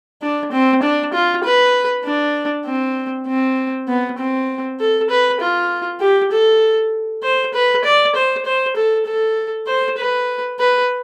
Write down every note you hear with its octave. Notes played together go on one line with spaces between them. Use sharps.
D4
C4
D4
F4
B4
D4
C4
C4
B3
C4
A4
B4
F4
G4
A4
C5
B4
D5
C5
C5
A4
A4
C5
B4
B4